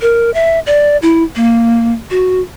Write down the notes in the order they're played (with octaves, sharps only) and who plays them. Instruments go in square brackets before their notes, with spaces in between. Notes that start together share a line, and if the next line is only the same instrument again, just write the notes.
[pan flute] A#4
E5
D5
E4
A#3
F#4